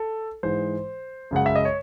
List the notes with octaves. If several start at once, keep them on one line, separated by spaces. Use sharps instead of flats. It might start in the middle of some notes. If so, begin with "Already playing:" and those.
Already playing: A4
G#2 E3 G#3 C5
F#2 C#3 G#3 F#5
E5
D#5
C#5